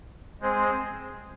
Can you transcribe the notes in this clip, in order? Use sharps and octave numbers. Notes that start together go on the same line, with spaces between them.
G#3 C4 G#4 C5